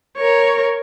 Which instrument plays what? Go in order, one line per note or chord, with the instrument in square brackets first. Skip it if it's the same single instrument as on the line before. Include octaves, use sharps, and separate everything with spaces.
[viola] A#4 C#5